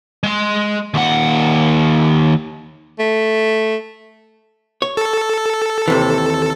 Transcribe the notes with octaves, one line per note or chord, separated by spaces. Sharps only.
G#3 C6
D#2 F#5
A3
C#5
A4
D#2 C3 E3